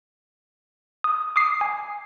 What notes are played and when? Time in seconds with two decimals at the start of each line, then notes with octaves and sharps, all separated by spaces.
1.04 D#6
1.36 D6 D#6 C7
1.61 G#5